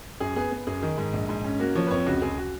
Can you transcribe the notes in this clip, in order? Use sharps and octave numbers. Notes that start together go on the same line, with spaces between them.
F#2 G#4
B3 G#4
B3
F#2 G#4
D#3
G#2
A#1
G#2
C#4
A#3 F#4
F3 C#5
B4
F2 C#5
C#2 F#4
C#2 G#4
F#4